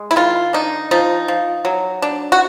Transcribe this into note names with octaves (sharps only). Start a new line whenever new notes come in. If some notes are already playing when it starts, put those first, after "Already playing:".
Already playing: G#3
E4
D#3 F4
D4 D#4
F3 D#4
F3
F#3
D4
F#4